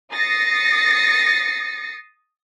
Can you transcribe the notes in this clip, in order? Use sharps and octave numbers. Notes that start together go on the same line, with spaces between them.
D#6 A6 A#6 C7 C#7